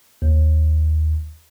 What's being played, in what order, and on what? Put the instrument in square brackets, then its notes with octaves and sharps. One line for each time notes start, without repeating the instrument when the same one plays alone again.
[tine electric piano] D#2